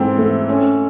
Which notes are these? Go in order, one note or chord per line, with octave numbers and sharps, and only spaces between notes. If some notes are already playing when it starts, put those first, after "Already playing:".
Already playing: G#2 E3 A3 C4
A3
C#4